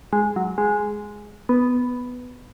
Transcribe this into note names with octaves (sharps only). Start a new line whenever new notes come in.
G#3
F#3
G#3
B3